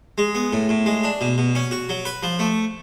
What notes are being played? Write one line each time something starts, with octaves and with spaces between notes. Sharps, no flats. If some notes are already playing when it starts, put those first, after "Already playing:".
G#3
B3
A2
A2
G#3
D4
B2
B2
C#4
F#4
F#3
B4
F3
A3